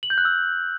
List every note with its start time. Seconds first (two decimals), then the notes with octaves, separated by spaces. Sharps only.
0.03 F#7
0.10 G6
0.18 F#6
0.25 E6